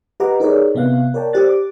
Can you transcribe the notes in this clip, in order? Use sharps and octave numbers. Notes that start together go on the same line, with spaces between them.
G4 B4 D#5 F#5 A#5 D6
D#4 G#4 A#4 B4 C#5 D5
C3 B3 E5 F5 F#6
A#4 C#5 D5 G5 A5
G4 C5 D5 F#6 A6
D6